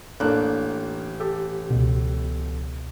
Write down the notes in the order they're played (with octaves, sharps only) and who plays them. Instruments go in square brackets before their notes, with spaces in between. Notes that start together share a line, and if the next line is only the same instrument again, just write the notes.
[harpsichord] A1 [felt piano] A#3 D4 F#6
[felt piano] G4 A4
[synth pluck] C#2 B2